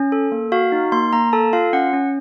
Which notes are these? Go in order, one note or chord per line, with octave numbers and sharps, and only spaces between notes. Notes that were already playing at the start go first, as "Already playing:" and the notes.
Already playing: C#4
A4
A#3
F#4 F5
D#4
A#3 C6
A#3 A#5
A4 A5
F4 F5
C#4 F#5
C#4